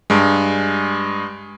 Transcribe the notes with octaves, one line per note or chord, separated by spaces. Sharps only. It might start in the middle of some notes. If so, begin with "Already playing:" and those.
G2 G#3